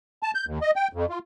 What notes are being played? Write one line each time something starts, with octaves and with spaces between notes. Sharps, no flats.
A5
G6
D#2
D#5
G5
F2
F4